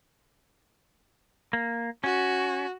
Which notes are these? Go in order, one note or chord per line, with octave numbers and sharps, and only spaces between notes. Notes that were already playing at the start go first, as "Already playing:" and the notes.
A#3
C#4 F#4